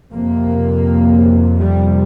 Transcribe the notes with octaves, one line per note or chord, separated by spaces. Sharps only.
F2 C3 A#3
G3